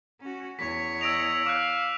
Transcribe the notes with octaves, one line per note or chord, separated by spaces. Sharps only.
C#4 F#4
E2 C#5 B6
D#5 E6 D7 F7
F5 D6 F#6